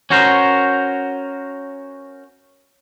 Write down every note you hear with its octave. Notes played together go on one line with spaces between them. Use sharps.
C#4 F#4 A#4 C5